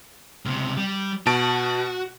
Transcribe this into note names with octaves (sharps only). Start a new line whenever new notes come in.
C#2 C3
G3
B2 F#4 A5 D7